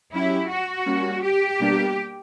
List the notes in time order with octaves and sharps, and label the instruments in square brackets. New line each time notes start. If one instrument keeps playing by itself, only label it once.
[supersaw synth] F#3 C#4 G4 [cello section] E4
[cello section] F#4
[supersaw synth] G3 A#3 C#4
[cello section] G4
[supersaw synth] B2 G3 A#3 D4